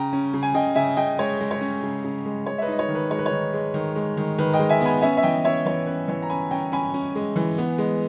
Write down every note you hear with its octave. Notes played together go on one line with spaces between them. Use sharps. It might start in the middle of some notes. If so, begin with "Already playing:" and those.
Already playing: C#3 G5 A#5
C#4
C#3
G#5
C#3 D#5 G5
C#3 E5 G#5
C#3 D#5 G5
G#3 C#5
G#3
C#5
C#4
C#3
C#3
G#3
G#3 C#5
E5
B4 D#5
D#4
D#5
C#5
D#3
B4
G#3 C#5
B4
C#5
D#3
G#3
D#3
G#3
D#3
D#3 B4
D#5 G5
G#3
E5 G#5
B3 G#5 B5
C#4 E5 G#5
E5
E3 D#5 G5
C#4 C#5 E5
E3 C#5
C#4 B4
E3 C#5
A#5
C#4 G#5 B5
C#4 G5 A#5
C#4 G#5 B5
C#4
G#3
E3
B3
G#3